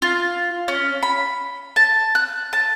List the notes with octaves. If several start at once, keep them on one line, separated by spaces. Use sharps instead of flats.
F4
C#4
B5
A5
F#6
A5